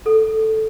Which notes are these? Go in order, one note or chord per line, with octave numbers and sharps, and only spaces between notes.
A4